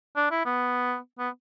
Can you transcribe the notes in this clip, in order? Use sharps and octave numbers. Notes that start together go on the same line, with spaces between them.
D4
E4
B3
B3